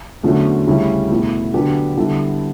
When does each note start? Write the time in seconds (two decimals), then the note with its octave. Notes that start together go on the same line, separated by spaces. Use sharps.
0.23 E2 D3 F#3 A3 C#4
0.67 D2 C#3 G3 C#4 E4
1.10 E2 B2 A3 E4
1.54 D3 F#3 B3 D4 G4
1.97 D3 G3 B3 E4 A4